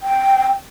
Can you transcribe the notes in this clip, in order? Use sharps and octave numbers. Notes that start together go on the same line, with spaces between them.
G5